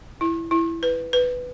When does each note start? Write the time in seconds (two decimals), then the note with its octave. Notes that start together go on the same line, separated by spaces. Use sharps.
0.21 E4
0.51 E4
0.83 B4
1.13 B4